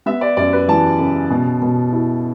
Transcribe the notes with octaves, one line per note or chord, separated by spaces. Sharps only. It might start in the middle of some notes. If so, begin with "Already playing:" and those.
B3 E5
D5
F#2 D5
B4
E3 A5
C#3
B2
B2
E4